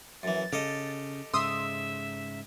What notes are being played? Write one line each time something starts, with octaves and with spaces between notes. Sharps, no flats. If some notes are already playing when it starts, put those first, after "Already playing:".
F#2 E3 A6
C#3 G4 A4 D#5
G#2 C#3 E5 C6 D#6 E6